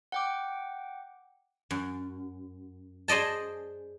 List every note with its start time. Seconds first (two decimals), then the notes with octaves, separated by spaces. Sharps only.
0.12 F#5 G5 D6
1.71 F#2
3.08 G#4 C5 D5 D#5 A5